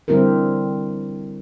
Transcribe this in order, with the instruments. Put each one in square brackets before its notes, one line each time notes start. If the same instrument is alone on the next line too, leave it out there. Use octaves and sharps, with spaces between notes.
[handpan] D3 G3 C4 E4 G4 A#4